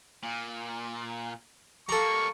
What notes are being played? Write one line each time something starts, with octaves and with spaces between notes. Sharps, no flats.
A#2
G3 A#3 A4 A#5 C#6